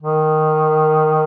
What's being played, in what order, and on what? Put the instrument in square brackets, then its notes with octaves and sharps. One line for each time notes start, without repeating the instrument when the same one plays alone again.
[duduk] D#3